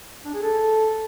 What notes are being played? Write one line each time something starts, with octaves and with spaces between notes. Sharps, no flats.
D4
G#4
A4